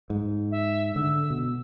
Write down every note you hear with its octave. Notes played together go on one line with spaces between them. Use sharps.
G#2
E5
D3 E6
B2